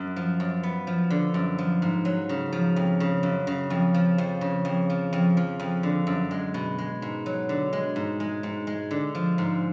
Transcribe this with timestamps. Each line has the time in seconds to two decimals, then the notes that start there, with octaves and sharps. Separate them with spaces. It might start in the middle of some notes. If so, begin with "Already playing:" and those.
Already playing: F#2
0.16 F3
0.40 F#2
0.63 B3
0.87 F3
1.10 D3
1.34 F#2
1.58 F3
1.82 G#2
2.05 F#3
2.29 C#3
2.52 F3
2.76 F2
3.00 C#3
3.23 F#2
3.47 C#3
3.70 F2
3.94 F3
4.18 F2
4.41 C#3
4.65 F2
4.90 F3
5.13 F2
5.37 F3
5.60 F2
5.83 D3
6.07 F#2
6.31 G#3
6.54 B2
6.78 G#3
7.02 G#2
7.26 F#3
7.49 D3
7.73 G#3
7.96 G#2
8.20 G#3
8.43 G#2
8.67 G#3
8.91 D3
9.15 F3
9.38 G#2